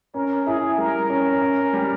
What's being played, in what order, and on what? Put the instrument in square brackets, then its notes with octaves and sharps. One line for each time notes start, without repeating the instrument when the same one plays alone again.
[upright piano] C#4 [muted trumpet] A#4
[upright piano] E4 [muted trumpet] G#4
[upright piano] G3 [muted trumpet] A#4
[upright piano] C#4
C#4
G3